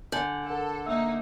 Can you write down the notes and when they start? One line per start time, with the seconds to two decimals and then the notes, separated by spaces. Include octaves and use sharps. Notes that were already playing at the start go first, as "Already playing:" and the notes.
0.12 D3 G#5 G6 F#7
0.47 A4 A#4 F#5
0.86 A#3 D#4 E5 E6